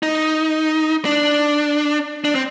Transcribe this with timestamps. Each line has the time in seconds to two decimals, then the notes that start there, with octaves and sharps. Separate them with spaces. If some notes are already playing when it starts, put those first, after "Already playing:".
0.03 D#4
1.05 D4
2.25 D4
2.35 C4